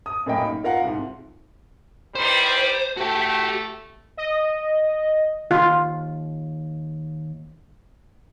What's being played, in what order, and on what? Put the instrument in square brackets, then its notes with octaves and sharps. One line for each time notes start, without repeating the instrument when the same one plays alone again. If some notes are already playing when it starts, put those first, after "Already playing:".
[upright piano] D#6
F#2 A2 A#3 D#5 G5 B5
D#4
F4 A#4 F5 F#5
C2 G#2
[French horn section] D#3 E3 G3 [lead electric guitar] C5
[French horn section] A3 [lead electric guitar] F#4 G4
[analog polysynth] D#5
[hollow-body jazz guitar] D#2 [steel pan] F4